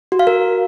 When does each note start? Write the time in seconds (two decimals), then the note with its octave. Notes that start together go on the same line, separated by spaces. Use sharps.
0.12 F#4
0.19 F5
0.27 A#4